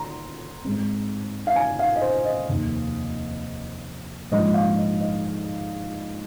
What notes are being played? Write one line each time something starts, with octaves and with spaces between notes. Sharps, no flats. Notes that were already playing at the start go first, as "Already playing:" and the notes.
Already playing: A#5 C6
G#2 G#3 C4
F5
G#5
F5
D#5
C5
D#5
F1 D#2 D#3
A#1 G#2 F3 D#5
F5
D#5
D#5